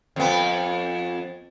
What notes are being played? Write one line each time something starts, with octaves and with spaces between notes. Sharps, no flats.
F2 B3